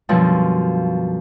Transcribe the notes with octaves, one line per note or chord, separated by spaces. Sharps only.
F#2 B2 D3 F3 G3